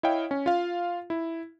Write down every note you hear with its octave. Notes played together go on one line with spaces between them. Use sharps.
E4 C#5 D#5 F5 G5
C#4
F4 F5
E4